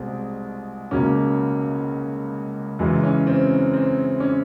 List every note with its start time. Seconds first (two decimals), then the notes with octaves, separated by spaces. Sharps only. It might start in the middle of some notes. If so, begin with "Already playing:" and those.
Already playing: C2 B2 G#3 C4
0.91 C#2 B2 F#3 A#3 C#4
2.79 F#2 C#3 E3 G#3
3.03 C#4
3.27 C4
3.73 C4
4.20 C#4